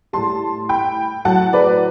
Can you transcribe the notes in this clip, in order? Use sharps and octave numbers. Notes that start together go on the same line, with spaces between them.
A2 G3 A5 C6
G5 B5
A2 F#3 F#5 A5
B4 D5